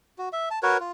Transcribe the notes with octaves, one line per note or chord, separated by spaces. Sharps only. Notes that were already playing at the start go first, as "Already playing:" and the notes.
F#4
E5
A5
F#4 A#4 B4 C#5
F4